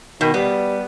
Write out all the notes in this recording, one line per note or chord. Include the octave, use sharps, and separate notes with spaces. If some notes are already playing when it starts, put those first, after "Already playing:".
B2 D#3
G3 B3